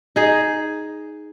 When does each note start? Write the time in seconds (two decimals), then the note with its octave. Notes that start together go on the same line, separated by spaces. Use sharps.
0.16 D#4 G#4